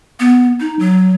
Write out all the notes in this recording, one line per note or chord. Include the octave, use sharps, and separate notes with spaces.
B3
D#4
F#3